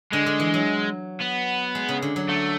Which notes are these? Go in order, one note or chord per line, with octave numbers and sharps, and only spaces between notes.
D3 G#3
D3
E3
F#3
B3
G#3
C#3
D3
F#3
A3